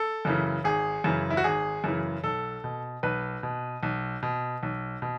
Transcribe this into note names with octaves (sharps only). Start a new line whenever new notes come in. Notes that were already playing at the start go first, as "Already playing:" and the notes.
Already playing: A4
F#2 C#3 E3
G#1 G#4
F#2 C#3 E3
E4
F#4
G#1 G#4
F#2 C#3 E3
B1 A4
B2
B1 B4
B2
B1
B2
B1
B2